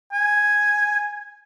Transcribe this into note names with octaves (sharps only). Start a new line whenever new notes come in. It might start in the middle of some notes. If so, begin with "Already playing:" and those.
G#5